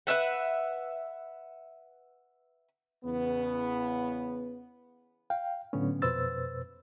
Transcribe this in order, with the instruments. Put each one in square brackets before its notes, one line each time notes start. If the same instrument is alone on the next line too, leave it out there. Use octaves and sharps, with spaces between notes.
[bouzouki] B4 C5 E5 F#5
[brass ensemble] E2 C#3 B3
[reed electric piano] F5 G5
A2 D3 F#3 B3 C#4
F2 B2 B4 C5 E6 A6